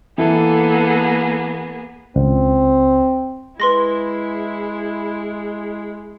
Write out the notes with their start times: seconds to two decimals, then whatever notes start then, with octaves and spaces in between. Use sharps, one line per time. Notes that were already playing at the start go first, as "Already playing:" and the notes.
0.18 E3 A#3 B3 E4 G#4 A4 F#5
2.16 C#2 C4
3.60 G#3 E4 B4 C6 A#6